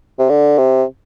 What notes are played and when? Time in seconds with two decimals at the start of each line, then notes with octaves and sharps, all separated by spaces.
0.19 C3
0.30 D3
0.57 C3